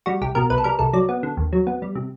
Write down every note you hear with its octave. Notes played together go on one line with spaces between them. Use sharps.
G3 F#4
C2 G4
B2 A#4
C2 B4
A4
G3 A#4
C2 A4
F#3 D5
B3
D3
D#2
F#3
B3
G3
C3